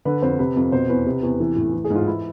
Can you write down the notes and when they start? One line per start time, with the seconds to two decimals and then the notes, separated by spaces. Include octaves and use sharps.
0.05 D3 B4
0.22 F2 C5
0.39 C3 B4
0.56 F2
0.72 B2 C5
0.89 E2 B4
1.06 C3
1.23 E2
1.40 E3
1.56 A2
1.74 E3
1.84 G#4
1.90 G#2
1.95 F4
2.07 E3 E4